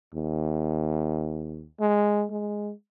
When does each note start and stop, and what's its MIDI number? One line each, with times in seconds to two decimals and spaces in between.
0.15 1.65 39
1.80 2.25 56
2.30 2.72 56